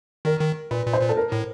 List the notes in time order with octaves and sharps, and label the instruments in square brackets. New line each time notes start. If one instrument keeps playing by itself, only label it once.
[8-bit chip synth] D#3 [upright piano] A#4
[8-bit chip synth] D#3
[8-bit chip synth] A#2 [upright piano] B4
[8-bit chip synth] A#2
[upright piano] C5
[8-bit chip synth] A#2
[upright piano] A4
A#4
[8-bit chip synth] A2